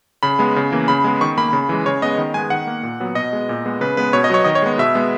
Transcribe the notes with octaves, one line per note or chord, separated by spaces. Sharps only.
C#3 B5
G#3 B3
C#3
E3 A#3
C#3 B5
G#3 B3
D#3 C#6
A#3 B5
C#3
E3 G#3
C#3 C#5
G#3 B3 D#5
D#3
G#3 B3 G#5
D#3 F#5
A#3
A#2
F#3 B3
B2 D#5
G#3 B3
A#2
G#3 B3
C#3 B4
G#3 B3 B4
B2 C#5
D#5
F#3 B3 C#5
D#3 D#5
C#5
G#3 B3
B2 E5
G#3 B3